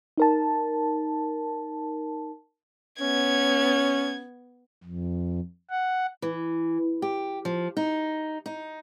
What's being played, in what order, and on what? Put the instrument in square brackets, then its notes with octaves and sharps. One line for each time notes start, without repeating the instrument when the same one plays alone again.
[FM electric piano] D#4 A#4 A5
[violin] B3 G#6 [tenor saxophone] C#4
[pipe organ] F2
F#5
[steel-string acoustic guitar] E3
G4
F3
D#4
D#4